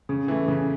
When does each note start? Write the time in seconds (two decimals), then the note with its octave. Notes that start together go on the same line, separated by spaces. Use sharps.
0.09 C#3
0.28 E3 A3
0.48 C#3